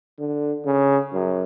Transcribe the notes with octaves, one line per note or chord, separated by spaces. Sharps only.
D3
C#3
F#2